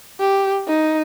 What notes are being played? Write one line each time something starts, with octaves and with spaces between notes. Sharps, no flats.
G4
D#4